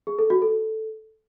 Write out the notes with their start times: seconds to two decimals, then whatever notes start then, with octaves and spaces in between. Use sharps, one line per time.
0.07 G#4
0.19 A4
0.30 F#4
0.42 A4